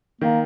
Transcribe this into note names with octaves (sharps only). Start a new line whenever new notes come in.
D#3 A#3